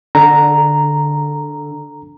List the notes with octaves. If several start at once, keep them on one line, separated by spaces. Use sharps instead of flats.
D3 A#5